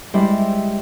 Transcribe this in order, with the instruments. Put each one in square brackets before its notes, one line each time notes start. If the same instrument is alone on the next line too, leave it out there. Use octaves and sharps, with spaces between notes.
[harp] G3 G#3 E4 C5